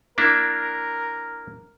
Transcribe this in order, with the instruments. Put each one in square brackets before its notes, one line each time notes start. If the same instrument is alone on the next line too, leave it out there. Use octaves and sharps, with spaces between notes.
[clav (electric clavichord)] A#3 D4 E4 [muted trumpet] A#4